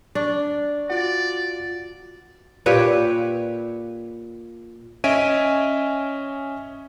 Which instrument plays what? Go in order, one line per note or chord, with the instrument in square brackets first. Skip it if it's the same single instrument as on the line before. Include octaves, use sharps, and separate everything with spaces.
[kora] D4 [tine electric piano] C#6
[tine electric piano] F4 F#4 F#5 [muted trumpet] D5
[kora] A#2 G4 B4 C#5
[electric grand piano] C#4 D#5 E5 G#5 D7 D#7